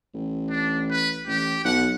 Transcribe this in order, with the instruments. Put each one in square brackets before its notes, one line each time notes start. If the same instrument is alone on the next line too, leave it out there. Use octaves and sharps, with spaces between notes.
[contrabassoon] A1
[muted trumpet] D4
B4
[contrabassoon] A1 [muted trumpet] G4
[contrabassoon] B1 [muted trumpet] F#5